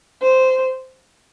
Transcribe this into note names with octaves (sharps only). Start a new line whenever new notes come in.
C5